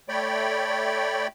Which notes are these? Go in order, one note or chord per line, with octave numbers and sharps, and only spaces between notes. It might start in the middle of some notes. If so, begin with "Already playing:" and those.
A3 C#5 D5 G5 B5